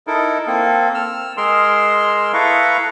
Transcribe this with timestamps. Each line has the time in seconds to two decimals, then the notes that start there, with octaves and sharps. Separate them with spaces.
0.07 D#4 E4 A4 A#4
0.47 A#3 C4 A4
0.94 E6 F6
1.37 G#3 G#4 A#4 C6 E6 F6
2.33 E4 A4 B4 F5 A#5 C#6